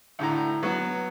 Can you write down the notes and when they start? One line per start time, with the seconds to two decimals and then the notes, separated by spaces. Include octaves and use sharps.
0.19 D2 A2 A#5
0.63 F#3 B3